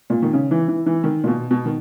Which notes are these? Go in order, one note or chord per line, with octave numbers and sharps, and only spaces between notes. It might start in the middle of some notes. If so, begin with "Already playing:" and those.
A#2
D#3
C#3
E3
E3
E3
D#3
A#2
B2
B2
D#3